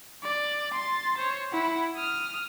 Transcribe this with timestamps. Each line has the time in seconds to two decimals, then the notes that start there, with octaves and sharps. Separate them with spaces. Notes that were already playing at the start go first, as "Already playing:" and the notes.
0.23 D5
0.73 C6 A6
1.18 C5 C#5
1.51 E4 F#5
1.97 D#6 F6